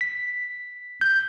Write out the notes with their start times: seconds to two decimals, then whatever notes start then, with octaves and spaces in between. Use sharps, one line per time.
0.01 B6
1.01 G6